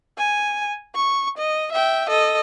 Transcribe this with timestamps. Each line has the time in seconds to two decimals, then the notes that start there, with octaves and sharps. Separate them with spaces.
0.18 G#5
0.95 C#6
1.38 D#5
1.72 E5 G5
2.10 A4 D#5